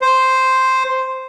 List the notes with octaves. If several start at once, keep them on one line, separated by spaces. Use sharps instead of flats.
C5